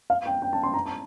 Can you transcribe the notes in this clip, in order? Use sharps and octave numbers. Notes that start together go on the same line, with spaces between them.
F5
G5
G5
A5
C6
A#5
A5